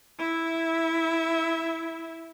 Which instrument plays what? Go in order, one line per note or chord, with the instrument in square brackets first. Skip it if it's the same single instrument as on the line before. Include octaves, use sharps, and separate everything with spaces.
[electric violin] E4 E5